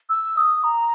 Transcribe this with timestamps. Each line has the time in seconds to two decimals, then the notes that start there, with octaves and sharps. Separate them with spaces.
0.09 E6
0.37 D#6
0.64 A#5